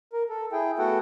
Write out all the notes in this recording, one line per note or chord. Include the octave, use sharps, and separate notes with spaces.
A#4
A4
E4 G#4 G5
A3 B3 F#4 A4 F#5 G5